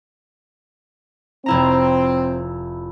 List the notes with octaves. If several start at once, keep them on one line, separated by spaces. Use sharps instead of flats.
F1 C4 E4 A#5